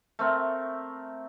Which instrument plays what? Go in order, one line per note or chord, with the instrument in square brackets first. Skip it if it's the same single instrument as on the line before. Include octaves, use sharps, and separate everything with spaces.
[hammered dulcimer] A3 C4 A#4